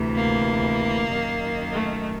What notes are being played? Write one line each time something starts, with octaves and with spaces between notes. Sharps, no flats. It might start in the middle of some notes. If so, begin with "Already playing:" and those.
Already playing: D2 C3 E3
A#3
F#2 D#3
A3